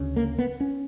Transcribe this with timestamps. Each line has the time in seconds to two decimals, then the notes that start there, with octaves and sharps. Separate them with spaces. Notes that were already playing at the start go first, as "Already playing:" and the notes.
Already playing: D2 C#3
0.16 A#3
0.39 B3
0.60 C#4